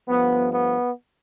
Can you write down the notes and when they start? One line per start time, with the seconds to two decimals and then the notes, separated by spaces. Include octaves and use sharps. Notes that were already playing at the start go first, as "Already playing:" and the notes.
0.08 G2 F3 A3 B3
0.51 B3